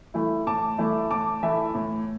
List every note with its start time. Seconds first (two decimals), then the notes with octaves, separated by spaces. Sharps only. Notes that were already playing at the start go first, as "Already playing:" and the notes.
0.14 E3 A3 E4
0.47 A2 A5 D6
0.78 E3 A3 E4
1.11 A2 A5 D6
1.43 E3 A3 E4 E5 A5
1.75 A2